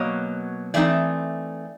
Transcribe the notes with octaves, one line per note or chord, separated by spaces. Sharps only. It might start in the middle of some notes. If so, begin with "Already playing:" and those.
Already playing: B2 F#3 A#3 C#5 D#5
E3 A3 C4 D#4 D5 E5